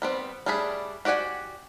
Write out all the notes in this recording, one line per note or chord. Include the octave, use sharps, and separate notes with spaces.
G3 B3 C4
G3 A3 D4 G#4 B5
F#4 G4 D5 F#5 G#5